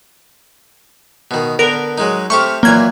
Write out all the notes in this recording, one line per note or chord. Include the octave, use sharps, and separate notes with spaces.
B2 D#3
D3 B3 A#4
F#3 G#3 D#4
A3 C4 G4 C#6 F6
A#2 E3 F#3 A#3 G#6